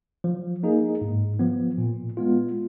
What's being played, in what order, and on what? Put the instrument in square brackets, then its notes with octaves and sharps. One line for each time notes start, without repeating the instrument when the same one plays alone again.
[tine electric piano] F3
A#3 D#4 G#4
G#2
F3 B3
A#2
G#3 B3 F4